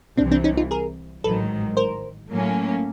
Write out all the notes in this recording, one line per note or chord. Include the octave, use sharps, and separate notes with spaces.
C2 C3 E3 C4 D4
C4 D4
C#4 D#4
D#4 F4
G#4 A#4
A1 G#2 D#3 F#3 A4 B4
A#4 C5
A2 F#3 A#3 C#4